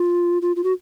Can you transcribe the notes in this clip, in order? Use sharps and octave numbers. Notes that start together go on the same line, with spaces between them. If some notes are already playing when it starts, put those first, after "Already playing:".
Already playing: F4
F4
F4
F#4